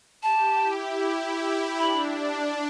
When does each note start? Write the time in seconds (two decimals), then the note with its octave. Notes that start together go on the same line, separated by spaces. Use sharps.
0.23 G4 A5
0.61 E4
1.01 E4
1.78 D4 B5